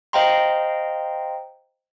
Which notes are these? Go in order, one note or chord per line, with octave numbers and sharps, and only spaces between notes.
C5 D#5 F5 G5 A#5 C6